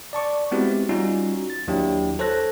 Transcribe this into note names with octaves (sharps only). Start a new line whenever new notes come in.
D5 A5 C#6 D6
G#3 B3 C4 E4 F#4 G4
G3 C#4 D#4 F4 F#4
A6
D#2 F#3 D4 E4 G4 G5
A4 C5 C#5 A5 F#6 A#6